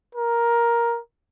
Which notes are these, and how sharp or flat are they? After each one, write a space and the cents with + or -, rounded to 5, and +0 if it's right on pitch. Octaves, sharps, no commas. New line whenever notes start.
A#4 +10